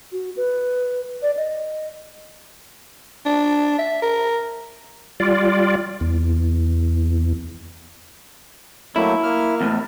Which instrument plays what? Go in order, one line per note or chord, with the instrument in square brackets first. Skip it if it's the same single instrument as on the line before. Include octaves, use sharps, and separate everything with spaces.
[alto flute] F#4
B4
D5
D#5
[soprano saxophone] D4
E5
A#4
[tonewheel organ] G3 F4 D5
E2
[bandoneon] F#3 A3 A#3 [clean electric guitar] E4
[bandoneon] A#3 F6
[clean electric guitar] E2 A2